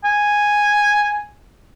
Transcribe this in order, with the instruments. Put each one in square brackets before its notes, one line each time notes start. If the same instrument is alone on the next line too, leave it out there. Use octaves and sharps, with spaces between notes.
[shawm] G#5